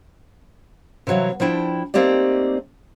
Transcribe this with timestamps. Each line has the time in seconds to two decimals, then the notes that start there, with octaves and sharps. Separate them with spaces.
1.07 C3 E3 F#3 C#5 F5
1.40 F3 D4 E4 G5
1.94 A3 A#3 C4 D#4 G4 D5